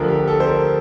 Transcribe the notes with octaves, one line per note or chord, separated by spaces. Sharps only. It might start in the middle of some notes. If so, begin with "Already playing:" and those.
Already playing: D2 D3 F3 A#4
G4
A4
C5
A#4